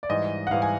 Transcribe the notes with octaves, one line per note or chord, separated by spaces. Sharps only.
D5
G#2 E3 G3 D#5
F#5
G#2 E3 G3 F5
G#5